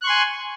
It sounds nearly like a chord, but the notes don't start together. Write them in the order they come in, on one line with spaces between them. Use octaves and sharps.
F#6 C#6 C6 G#5